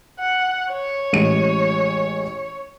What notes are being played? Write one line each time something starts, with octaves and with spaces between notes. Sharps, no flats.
F#5
C#5
A1 G#3 D#7